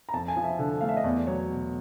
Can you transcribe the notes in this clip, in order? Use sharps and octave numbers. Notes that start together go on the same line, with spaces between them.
A#5
F2 A5
G#5
F3
E5
D3
A3 F5
E5
D#5
E2 D5
F#3 C#5
B2